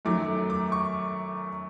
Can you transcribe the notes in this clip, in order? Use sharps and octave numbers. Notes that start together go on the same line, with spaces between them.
F#2 D#3 F#3 A3 D6
D6
C#6